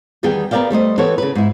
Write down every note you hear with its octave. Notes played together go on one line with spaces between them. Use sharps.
E2 D#3 G3 B3 G#4 G5
B3 A#4 C#5 D5 F5 G5
G3 A3 C5 D#5
E3 B3 G4 A4 C#5
C#3 B4
G#2 E4